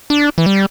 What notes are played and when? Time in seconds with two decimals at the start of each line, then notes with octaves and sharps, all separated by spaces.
0.10 D4
0.38 E3
0.46 G3